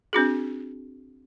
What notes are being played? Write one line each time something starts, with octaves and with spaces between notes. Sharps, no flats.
C4 D4 F#4 G#4